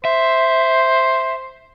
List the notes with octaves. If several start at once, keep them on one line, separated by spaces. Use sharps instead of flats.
C5 E5